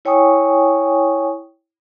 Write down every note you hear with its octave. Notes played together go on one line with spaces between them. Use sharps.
E4 C#5 G5 G#5 C#6 D#6